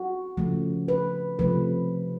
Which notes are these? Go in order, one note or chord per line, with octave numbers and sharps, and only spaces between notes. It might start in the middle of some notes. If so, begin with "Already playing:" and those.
Already playing: F#4
C#3 F3 A3
B4
C3 F3 A3 B4